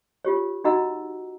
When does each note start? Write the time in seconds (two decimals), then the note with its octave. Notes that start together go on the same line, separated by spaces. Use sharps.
0.25 F4 G4 C#5
0.64 D#4 F#4 D#5 F#5 A#5 E6